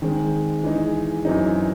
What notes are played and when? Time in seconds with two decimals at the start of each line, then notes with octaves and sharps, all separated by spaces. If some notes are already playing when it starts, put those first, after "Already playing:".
0.02 D#3 G#3 C4
0.63 E3 G#3 D#4
1.25 F#2 E3 C4 D#4